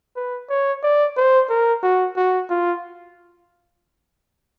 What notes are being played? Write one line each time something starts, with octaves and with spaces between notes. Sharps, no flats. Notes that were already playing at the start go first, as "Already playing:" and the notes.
B4
C#5
D5
C5
A#4
F#4
F#4
F4